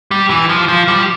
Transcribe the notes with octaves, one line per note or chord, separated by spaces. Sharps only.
G3
E3
F3
F3
G3